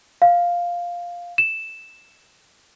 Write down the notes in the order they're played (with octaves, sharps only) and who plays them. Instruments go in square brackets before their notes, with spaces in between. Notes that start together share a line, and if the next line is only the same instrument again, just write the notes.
[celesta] F5
E7